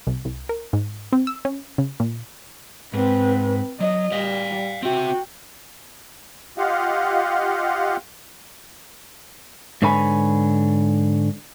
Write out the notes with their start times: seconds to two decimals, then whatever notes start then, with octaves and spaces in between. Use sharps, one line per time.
0.07 C2
0.25 C2
0.49 A#4
0.73 G#2
1.13 C4
1.27 E6
1.45 C#4
1.78 C#3
2.00 A#2
2.94 G#2 C4 B4
3.80 F#3 D#5
4.12 G3 D5 F5
4.83 C4 F#4 E5 G5
6.58 F4 G4 D#5 F5 F#5
9.82 G#2 D3 B4 C#5 G#5 B5